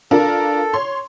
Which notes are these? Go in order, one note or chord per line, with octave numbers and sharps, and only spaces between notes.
D4 F4 A4 A#4
C#5 C6